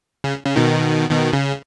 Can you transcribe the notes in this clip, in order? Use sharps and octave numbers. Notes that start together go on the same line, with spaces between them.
C#3
C#3
B2 D#3
B2 D#3
C#3